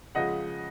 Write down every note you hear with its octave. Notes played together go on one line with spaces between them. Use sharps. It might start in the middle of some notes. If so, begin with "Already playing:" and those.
C#3 F3 G#3 D#5 F#5